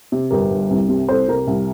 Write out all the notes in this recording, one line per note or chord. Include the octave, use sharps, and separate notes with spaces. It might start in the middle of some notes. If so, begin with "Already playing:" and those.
C3
G1 G4 A#4
G2
C2
C3
C2 A4 C5
C3 G4 A#4
C2